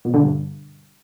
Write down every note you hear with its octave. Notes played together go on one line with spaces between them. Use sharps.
B2
D3
G2